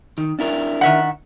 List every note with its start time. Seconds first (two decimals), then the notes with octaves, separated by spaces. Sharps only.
0.18 D#3
0.39 D4 E4 A#4
0.81 D#3 E5 F#5